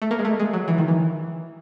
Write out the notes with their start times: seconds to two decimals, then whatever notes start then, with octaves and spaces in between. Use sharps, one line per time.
0.02 A3
0.11 A#3
0.19 G#3
0.25 A3
0.40 G#3
0.53 F#3
0.68 E3
0.78 D#3
0.88 E3